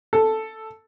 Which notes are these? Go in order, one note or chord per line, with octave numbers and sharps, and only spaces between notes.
A4